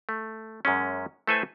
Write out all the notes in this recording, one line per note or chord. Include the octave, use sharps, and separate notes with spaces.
A3
F#2 G#3 C#4
A3 E4 A4 B4 C5 G#5